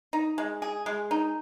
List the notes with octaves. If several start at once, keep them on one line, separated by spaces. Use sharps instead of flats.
D#4
G#3
G#4
G#3
D#4